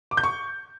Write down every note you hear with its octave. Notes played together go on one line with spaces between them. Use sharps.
D6
G6
C#6